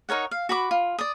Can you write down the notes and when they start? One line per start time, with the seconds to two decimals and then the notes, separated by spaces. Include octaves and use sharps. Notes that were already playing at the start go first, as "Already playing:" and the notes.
0.09 D#4 A#4 C#5 F#5
0.31 F5
0.49 F#4 B5 D6
0.71 F4
0.99 D5 D#6